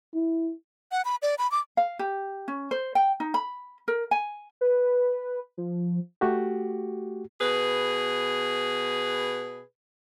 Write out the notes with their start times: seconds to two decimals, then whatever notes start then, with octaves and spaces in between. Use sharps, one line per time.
0.14 E4
0.92 F#5
1.05 B5
1.22 D5
1.38 B5
1.52 D6
1.77 F5
1.99 G4
2.48 C#4
2.71 C5
2.95 G5
3.20 D#4
3.34 B5
3.88 A#4
4.11 G#5
4.61 B4
5.58 F3
6.21 A3 F#4 G4
7.40 B2 G#4 B4